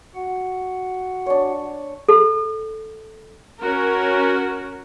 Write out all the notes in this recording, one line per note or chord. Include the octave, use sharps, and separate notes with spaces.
F#4 F#5
D4 C#5
A4
C#4 F#4 A#4